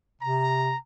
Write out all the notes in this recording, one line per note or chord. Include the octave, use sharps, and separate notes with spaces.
C3 A#5